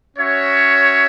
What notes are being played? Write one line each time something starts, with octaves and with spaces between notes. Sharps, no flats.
C#4 F#4 C#5 E5